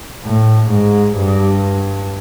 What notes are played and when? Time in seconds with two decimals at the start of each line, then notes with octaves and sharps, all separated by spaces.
0.24 A2
0.71 G#2
1.17 G2